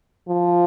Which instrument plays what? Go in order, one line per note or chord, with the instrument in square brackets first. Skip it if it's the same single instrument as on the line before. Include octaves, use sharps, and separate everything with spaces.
[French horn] F3